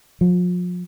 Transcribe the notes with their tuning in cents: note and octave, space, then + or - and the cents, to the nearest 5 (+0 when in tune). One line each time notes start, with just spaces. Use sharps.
F3 +40